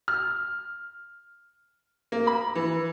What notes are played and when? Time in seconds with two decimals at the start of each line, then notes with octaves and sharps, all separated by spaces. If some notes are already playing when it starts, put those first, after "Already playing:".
0.08 F6
2.12 A#3
2.27 B5
2.55 E3